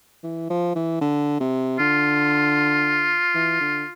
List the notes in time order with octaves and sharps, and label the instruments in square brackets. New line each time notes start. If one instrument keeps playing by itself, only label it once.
[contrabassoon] E3
F3
E3
D3
C3
[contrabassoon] D3 [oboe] F4
[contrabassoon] E3
D3